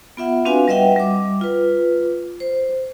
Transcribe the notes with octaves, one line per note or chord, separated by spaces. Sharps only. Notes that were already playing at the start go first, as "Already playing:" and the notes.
B3 F4 E5 F#5
C4 D4 F#4 B4 F5 G#5
G3 B4 D#5 E5 F#5 G5
G3 D6
F4 B4
C5